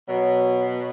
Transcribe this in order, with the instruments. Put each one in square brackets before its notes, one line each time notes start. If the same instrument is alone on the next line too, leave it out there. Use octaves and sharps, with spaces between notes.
[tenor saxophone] B2 [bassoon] F#3